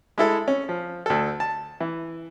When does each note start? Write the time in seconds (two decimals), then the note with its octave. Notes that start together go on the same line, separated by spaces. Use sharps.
0.18 G#3 E4 A4
0.48 C#4
0.69 F3
1.06 D2 A4
1.40 A5
1.80 E3